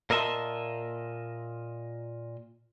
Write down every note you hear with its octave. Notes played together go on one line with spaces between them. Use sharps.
A#2 A#4 D#5 E5 A5 C6